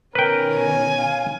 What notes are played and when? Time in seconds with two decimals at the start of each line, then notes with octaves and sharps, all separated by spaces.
0.15 B2 D#3 C#4 A#4 B4 G5
0.56 G#5
0.98 F5